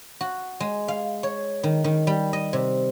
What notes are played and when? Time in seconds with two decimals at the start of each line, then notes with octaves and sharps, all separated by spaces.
0.21 F#4
0.60 G#3
0.88 F5
1.23 C#5
1.63 D#3
1.84 D#3
2.07 G3
2.33 D#5
2.53 C3